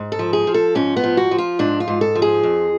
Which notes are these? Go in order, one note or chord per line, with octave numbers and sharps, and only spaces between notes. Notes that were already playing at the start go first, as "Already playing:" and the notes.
Already playing: G#2
A4
F3
G#4
F3
A4
G#2 C#4
B3
F3
F#4
F3
F4
G#2 D4
F4
G#2
A4
F3
G#4
F2